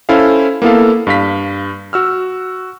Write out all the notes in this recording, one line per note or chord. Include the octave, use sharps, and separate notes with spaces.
C#4 E4 A4 C5 F5
A#3 B3 E4 A4 F5
G2 F5 B6
F#4 E6 F6